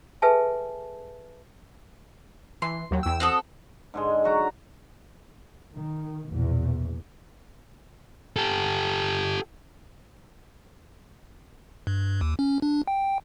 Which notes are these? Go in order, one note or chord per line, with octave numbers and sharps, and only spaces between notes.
G#4 A4 B4 E5 G#5 A5
E3 C6
D#2 F#3 G5
E2 E6
C4 F#4 A4 D#6
G#2 D3 G#3
F#3 F#4 A#5
D#3
A#1 E2 B2
G4 A4
G2
D#2
C#4
D4
G5